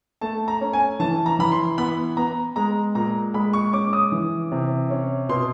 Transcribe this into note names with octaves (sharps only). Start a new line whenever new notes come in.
A3 A5
A#5
C#4
G#5
E3 A5
A#5
E3 B5
C6
B3 B5
B3 A#5
G#3 A#5
A#2 A#5
G#3 B5
C#6
C#4 D6
D#6
E3
C3
C#4
B2 C6